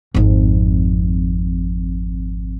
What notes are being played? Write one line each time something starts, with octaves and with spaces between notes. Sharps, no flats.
G#1 F2